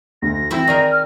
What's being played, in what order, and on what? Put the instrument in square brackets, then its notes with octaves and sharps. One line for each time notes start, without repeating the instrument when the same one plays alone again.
[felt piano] D2 [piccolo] A#6
[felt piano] E3 [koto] C4 E4 E5
[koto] D#3 G#4 A#4 [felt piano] D5
[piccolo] F6